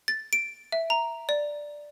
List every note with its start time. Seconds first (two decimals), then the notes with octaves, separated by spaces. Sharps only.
0.08 A6
0.33 D7
0.72 E5
0.90 A#5
1.29 D5